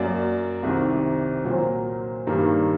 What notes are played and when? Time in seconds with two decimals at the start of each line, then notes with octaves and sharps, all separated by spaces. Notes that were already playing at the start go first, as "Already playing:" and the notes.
Already playing: F#2 F#3 A#3 D5
0.63 C2 C3 D#3
1.44 A#2 F#3 A#3 C5
2.27 G2 D#3 G3 A#3